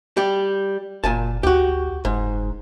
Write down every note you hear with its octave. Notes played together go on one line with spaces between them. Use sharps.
G3 G4
F#1 A#2 G#5 A5
D2 F#4 G4
F#1 G#2